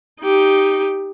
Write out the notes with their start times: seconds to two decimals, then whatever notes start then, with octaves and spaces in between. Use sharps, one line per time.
0.22 D#4 G4